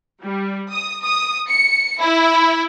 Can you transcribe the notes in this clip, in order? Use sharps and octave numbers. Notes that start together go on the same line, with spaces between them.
G3
D#6
D#6
C#7
E4